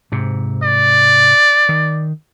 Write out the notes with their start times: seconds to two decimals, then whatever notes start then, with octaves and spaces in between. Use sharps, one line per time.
0.12 G#2 C3
0.63 D5
1.69 D#3